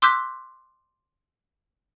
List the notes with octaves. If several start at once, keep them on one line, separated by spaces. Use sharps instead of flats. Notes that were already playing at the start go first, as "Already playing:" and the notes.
C6 D6 E6 F#6 G6 B6